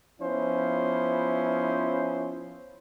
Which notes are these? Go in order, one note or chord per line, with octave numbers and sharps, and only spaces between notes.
F3 B3 C#4 E4 C5